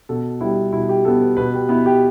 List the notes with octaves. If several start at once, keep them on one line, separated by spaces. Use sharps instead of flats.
B2 A4
G3 B3 E4
B2 E4
G4
G3 B3 A4
B4
B2 B4
G4
B3 E4
G4